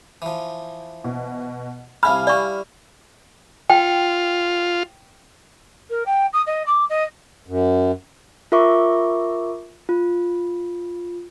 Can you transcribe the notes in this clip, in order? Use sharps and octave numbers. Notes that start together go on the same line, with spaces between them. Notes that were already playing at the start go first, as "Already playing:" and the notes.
E3 F3
B2
C2 E4 F5 G#5 A5 B5 F6
G3 E4 D5 C#6
F4 G5
A#4
G5
D#6
D#5
D6
D#5
F#2
F4 A#4 E5 C#6 D6
F4